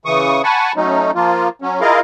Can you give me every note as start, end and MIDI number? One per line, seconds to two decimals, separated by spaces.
0.06 0.42 49
0.06 0.42 52
0.06 0.42 85
0.06 0.42 87
0.44 0.73 78
0.44 0.73 80
0.44 0.73 81
0.44 0.73 83
0.44 0.73 85
0.76 1.11 54
0.76 1.11 57
0.76 1.11 61
0.76 1.11 63
1.15 1.49 53
1.15 1.49 58
1.15 1.49 65
1.62 1.81 54
1.62 1.81 61
1.81 2.00 64
1.81 2.00 65
1.81 2.00 68
1.81 2.00 70
1.81 2.00 75
1.81 2.00 77